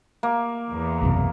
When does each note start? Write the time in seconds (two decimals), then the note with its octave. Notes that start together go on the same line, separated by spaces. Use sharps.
0.23 A#3
0.71 E2
1.01 B1 F#2 C3